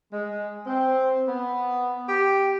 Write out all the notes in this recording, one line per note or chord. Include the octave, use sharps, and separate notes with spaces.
G#3
C4
B3
G4